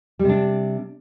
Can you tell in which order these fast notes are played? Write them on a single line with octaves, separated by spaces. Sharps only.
G3 C3 D4